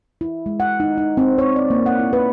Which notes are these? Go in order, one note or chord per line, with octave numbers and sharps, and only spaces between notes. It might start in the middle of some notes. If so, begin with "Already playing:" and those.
E4
G#3
F#5
D#4
D#4
C4
C#5
D5
A#3
F#5
E4
B4